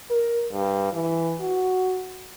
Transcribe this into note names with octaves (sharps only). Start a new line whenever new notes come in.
A#4
G2
E3
F#4